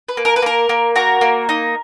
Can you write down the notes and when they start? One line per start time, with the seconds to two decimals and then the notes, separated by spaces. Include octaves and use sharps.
0.08 B4
0.17 A#3
0.25 A#4
0.36 B4
0.42 A#3 A#4
0.69 A#3
0.96 F#4 A#4
1.21 A#3
1.49 D#4